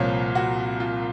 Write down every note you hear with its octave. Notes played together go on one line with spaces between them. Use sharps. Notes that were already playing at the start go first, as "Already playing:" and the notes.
Already playing: C2 A#2 F3 C#5
F#4
F4